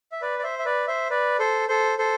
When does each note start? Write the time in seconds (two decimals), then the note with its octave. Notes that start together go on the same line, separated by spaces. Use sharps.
0.12 E5
0.22 B4 D5
0.39 D5
0.44 C5 E5
0.59 E5
0.65 B4 D5
0.87 C5 E5
1.10 B4 D5
1.39 A4 C5
1.69 A4 C5
1.98 A4 C5